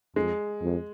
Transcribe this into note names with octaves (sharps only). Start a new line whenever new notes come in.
F2 G#3
F2